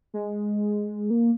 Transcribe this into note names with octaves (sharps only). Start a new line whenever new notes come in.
G#3
A#3